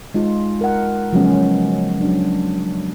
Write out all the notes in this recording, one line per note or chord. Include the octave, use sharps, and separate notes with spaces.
G#3 D#4 F4
A#4 F#5
C#3 F3 F#3 G#3 B3 C#4
F#3 D4